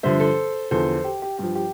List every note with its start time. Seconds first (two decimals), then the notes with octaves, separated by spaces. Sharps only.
0.03 G2 D3 F3 C5 E5
0.20 A4 C5
0.71 E2 D3 F3 A4 C5
1.04 G4
1.22 G4
1.38 G2 F3 G4
1.55 G4